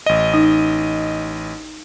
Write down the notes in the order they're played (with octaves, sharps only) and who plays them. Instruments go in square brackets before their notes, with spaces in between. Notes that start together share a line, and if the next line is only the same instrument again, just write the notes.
[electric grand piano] A1 D#5
[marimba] D#4